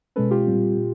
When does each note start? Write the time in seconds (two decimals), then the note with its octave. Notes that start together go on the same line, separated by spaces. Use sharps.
0.16 B2 G#3 C#4 A4 B4
0.31 F4 G4
0.47 A#2 G3 C4
0.77 A#2